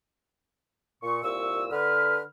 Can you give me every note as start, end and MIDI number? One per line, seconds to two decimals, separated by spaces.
1.03 1.20 46
1.03 1.20 85
1.23 1.66 36
1.23 1.66 46
1.23 1.66 85
1.23 1.66 88
1.71 2.22 50
1.71 2.22 71
1.71 2.22 89